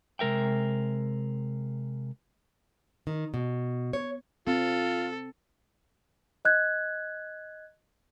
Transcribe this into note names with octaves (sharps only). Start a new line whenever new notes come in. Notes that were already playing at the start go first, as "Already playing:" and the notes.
C3 G#3 A#4 E5 G5
D#3
B2
C#5
C4 F4 A4
D#5 F#6 G#6